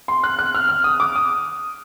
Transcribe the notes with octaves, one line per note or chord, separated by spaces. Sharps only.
C6
F#6
F#6
F6
F6
D#6
D6
D#6